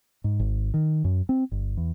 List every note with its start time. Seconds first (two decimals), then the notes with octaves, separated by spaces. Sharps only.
0.24 G#2
0.40 G#1
0.74 D#3
1.04 F#2
1.29 C4
1.52 G1
1.77 E2